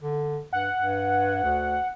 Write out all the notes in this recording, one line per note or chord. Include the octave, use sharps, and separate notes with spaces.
D3
G2 F#5
G2
D2